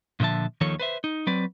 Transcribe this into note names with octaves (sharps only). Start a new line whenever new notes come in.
A#2 D3 F3 E5 A5
D#2 D#3 F3 A4 C#5
B4 C5 E5
D#4
F#3 C4 B4 D5